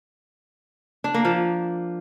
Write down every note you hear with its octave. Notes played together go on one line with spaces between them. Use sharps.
D4
A#3
F3